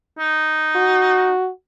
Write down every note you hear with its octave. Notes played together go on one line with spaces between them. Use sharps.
D#4
F#4